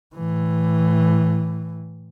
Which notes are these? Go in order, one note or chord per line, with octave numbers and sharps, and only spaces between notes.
A2 E3